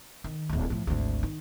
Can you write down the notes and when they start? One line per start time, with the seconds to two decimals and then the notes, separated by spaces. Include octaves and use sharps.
0.24 D#3
0.49 D1 A#1
0.70 A2 F3
0.87 G#1 D2
1.23 D#3